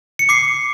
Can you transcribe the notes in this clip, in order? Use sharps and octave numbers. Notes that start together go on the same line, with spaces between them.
C#7
D6 C7